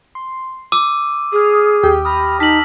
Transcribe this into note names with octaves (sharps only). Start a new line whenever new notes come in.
C6
D6 E6 D#7
G#4 D#6 F6
D#2 G4 G5
B5 D#6 F6 A#6
D#4 A5 E6 F6 B6 F#7